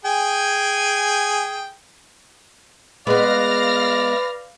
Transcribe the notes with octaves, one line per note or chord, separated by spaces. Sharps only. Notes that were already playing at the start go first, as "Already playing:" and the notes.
G#4 G5 G#5
G#3 B3 B4 D5 F5 F6 A#6